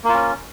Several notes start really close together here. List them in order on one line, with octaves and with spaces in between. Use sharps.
A#3 F4 C#4